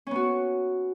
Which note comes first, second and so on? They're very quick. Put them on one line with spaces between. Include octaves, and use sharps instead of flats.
C#4 B3 F#4